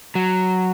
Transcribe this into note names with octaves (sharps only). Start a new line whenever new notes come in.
F#3